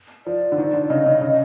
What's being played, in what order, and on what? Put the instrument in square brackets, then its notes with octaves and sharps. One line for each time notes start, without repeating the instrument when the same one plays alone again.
[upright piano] F3 [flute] D5
[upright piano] D3
D#3
D3
[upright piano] C#3 [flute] D#5
[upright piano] C#3
C#3